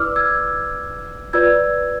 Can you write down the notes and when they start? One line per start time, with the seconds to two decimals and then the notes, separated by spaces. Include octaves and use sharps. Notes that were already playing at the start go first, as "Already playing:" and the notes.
Already playing: E4 B4 D5 D6 E6 F6
0.16 E6 G#6
1.33 F4 B4 D5 E6 G#6